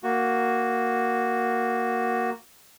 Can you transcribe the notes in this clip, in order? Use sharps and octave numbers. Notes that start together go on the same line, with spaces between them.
A#3 F#4